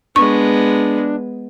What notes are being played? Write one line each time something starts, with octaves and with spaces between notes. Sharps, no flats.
G#3 B3 D4 C#6